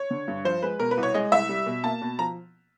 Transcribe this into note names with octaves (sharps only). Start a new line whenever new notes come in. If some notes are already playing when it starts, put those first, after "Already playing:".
Already playing: C#5
D3
G2
F3 C5
G#3 B4
B2 A#4
B4
C2
C#5
G#3 D#5
C2 E5
G3
B2
A#3 A5
B2
F3 A#5